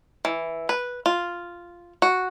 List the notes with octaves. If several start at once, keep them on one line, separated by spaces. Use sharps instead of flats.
E3
B4
F4
F#4